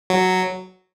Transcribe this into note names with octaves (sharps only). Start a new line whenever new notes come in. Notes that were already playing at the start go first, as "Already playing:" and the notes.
F#3